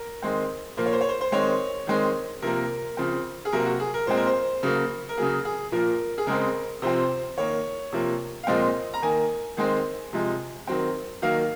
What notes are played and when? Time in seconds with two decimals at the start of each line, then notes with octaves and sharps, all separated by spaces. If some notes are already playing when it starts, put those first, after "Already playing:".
Already playing: A#4
0.22 D#3 G#3 C4
0.77 A#2 F3 A#3 C5
0.86 C#5
0.93 C5
1.01 C#5
1.09 C5
1.21 C5
1.32 D#3 G#3 C4 C#5
1.87 D#3 G#3 C4
2.42 C3 F3 A#3 A#4
2.97 C#3 F3 C4
3.45 G#4
3.53 C3 F#3 A#3 A#4
3.66 F#4
3.80 G#4
3.94 A#4
4.07 A#2 G#3 C4 C5
4.17 A#4
4.27 C5
4.63 C#3 F#3 A#3
5.09 A#4
5.17 C#3 F#3 A#3 G#4
5.45 G#4
5.72 A#2 F3 A#3 A#4
6.18 G#4
6.27 C#3 G#3 C4 A#4
6.82 C3 F3 C4 C5
7.38 D#3 A#3 C#5
7.92 C3 F3 A#3
8.43 F5
8.47 A#2 F3 G#3 C4 D#5
8.94 A#5
9.02 D#3 A#3 G#5
9.57 D#3 G#3 C4
10.13 C3 F3 G#3
10.67 D#3 F#3 C4
11.22 D#3 F#3 A#3 F5